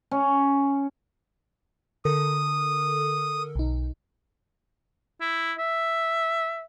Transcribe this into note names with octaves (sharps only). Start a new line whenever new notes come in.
C#4
D3 A4 A#4 D#6
B1 D#4
E4
E5